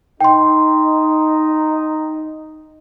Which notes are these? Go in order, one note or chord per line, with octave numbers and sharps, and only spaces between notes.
D#4 G5 C6